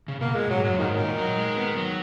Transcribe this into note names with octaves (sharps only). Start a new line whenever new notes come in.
C#3
B2 A#3
A#2 G#3
G#2 F#3
F#2 F#3
G#2 D#3
A#2 D#3
F#3
G#3
B3
F#3